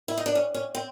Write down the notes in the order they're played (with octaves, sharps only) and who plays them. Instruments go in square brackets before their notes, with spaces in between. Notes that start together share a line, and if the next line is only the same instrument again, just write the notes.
[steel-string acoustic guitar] E4
D#4
D4
C#4
C#4
C4